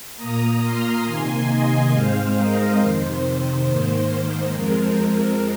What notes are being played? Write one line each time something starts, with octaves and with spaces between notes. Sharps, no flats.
A#3 A#5 D#6
A#2
C6 F6
C3 D#3 A#3 G#5 C6
D#5 G#5
G#2 G#3 C4 C5 F5
A#4 D#5
F2 C3 D#3 C5
C5
G#2 D#3 A#3
F2 F3 G#3 C4 A#4